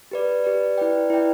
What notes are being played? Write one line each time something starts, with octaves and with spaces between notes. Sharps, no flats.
G4 B4 D5
G4 B4 D5
E4 B4 D5 G5
E4 B4 D5 G5